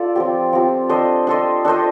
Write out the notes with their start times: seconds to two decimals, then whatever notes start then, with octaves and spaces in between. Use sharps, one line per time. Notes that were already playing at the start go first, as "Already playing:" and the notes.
Already playing: F4 A4 D5
0.16 F3 C4 G4
0.53 F3 C4 G4
0.89 D4 A4 C5 D#5
1.27 D4 A4 C5 D#5
1.65 D4 A4 C5 D#5